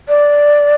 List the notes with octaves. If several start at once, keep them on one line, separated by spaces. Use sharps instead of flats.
D5